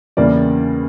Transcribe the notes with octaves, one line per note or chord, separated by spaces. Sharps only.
E2 C#3 E3 G3 A#3 D5